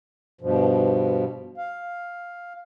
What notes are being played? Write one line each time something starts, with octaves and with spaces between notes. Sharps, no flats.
G2 B2 F3
F5